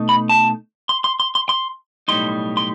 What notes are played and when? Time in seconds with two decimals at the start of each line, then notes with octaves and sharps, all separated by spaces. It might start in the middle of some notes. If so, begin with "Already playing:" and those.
Already playing: B2 A3 D#4
0.09 B5
0.29 A5
0.89 C6
1.04 C6
1.20 C6
1.35 C6
1.49 C6
2.08 B1 A2 G3 D#4 C6
2.57 C6